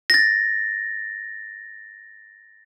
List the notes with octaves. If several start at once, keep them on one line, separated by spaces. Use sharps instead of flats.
A6 A#6